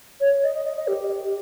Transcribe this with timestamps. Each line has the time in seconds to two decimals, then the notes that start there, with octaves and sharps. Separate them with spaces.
0.20 C#5
0.43 D#5
0.55 D#5
0.65 D#5
0.77 D#5
0.87 G4